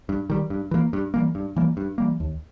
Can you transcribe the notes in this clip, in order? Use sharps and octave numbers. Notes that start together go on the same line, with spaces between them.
G2
D#3 G3
G2
E3 G3 A#3
G2
E3 G3 A#3
G2
E3 G3 A#3
G2
E3 G3 A#3
D#2